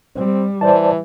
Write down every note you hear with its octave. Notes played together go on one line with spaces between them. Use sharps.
G3 C4
E3 C5 D5 A5